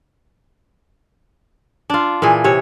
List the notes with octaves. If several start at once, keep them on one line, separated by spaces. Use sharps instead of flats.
D4 F4
A#2 E3 G#4
C3 C#5